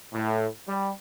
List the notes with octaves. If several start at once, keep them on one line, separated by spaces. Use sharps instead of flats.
A2
G3